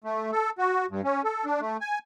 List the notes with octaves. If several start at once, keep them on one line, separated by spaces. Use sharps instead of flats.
A3
A4
F#4
G2
C#4
A4
D4
A3
G#5